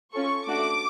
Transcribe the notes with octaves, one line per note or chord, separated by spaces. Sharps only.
C#4 F4 A4 C#6
A3 D4 F#4 D6